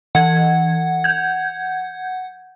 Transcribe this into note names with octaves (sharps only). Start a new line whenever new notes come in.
E3 F#5 G#6
G6 G#6